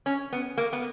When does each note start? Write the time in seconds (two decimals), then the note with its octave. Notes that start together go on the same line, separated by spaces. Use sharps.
0.06 C#4
0.33 B3
0.58 A#3
0.73 B3